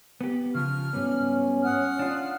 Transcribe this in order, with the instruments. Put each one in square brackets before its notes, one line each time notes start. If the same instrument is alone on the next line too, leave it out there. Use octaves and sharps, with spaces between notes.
[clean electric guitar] B3 G4
[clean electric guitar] C#3 F3 [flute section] F6
[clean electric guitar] G#2 G3 B3 [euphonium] C#4
[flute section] F#5 D#6 F6
[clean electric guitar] D4 F4